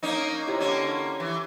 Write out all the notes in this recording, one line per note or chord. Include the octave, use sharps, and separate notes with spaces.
A#3 C#4 D#4
C3 E4 G4 C#5
D3 A#3 C#4
E3